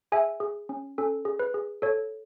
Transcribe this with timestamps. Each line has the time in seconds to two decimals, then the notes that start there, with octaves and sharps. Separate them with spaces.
0.12 G#4 E5 G#5
0.40 G#4
0.69 C#4
0.98 C#4 A4
1.25 G#4
1.39 B4
1.54 G#4
1.82 A4 C#5